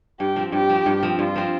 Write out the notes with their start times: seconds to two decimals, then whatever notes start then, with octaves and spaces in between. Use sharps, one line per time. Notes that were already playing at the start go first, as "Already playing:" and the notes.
0.20 G2 G4
0.36 F3 C4
0.52 G2 G4
0.70 F3 C4
0.86 G2
1.03 F3 C4
1.19 G2 F4
1.36 F3 C4